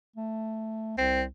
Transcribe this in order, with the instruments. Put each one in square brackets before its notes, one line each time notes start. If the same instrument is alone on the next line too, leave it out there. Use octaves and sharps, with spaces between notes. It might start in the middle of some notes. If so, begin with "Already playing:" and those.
[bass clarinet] A3
[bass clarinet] C2 [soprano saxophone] C4